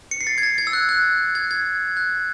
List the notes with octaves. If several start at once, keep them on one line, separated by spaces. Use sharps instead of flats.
C#7
C7
A6
G#6
A6
G#6
E6
F#6
F#6
G#6
G#6
F#6